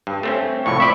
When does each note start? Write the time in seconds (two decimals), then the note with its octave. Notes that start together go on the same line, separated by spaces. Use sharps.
0.07 G2
0.23 A3 C4 C#4
0.66 C2 F2 A2 C#6
0.80 C5 D5 E5 B5